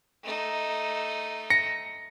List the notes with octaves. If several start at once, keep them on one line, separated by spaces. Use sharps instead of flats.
A3 D#4
A#6 C#7